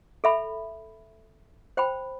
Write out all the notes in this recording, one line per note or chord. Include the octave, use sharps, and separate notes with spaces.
A4 E5 B5
C5 G5 B5